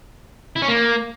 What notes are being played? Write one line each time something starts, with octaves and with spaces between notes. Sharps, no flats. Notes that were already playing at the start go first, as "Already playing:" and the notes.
E4
C#4
A#3